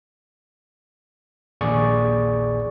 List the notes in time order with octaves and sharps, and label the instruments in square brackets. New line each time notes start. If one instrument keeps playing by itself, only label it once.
[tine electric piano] A#1 D#2 G#4 D5 C#6